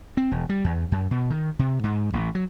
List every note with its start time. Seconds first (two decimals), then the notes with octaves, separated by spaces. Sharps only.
0.17 C4
0.32 E1
0.49 G3
0.64 E2
0.92 F#2
1.11 B2
1.30 D#3
1.59 C3
1.84 G#2
2.13 A1
2.35 F#3